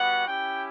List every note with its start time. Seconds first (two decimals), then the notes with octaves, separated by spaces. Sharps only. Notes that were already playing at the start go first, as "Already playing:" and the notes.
Already playing: G3 B3 F#4 F#5
0.27 C#4 E4 G4 G5